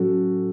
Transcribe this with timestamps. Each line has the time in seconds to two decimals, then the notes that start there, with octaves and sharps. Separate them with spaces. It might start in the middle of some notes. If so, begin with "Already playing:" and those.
Already playing: A2 F#3 C#4 F#4 A4